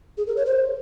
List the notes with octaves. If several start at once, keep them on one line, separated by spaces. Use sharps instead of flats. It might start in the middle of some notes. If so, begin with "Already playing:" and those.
G#4
A#4
C#5
C5